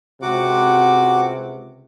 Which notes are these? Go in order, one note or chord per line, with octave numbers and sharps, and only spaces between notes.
C#2 C3 F#4 F#5 D6